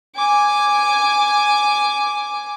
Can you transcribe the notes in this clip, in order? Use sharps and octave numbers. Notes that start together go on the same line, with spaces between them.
G#5 D6